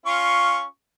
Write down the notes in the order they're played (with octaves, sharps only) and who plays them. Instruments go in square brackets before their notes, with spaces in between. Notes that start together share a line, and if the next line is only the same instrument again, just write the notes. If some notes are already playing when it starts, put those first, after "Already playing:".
[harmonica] C#4 F4 C#6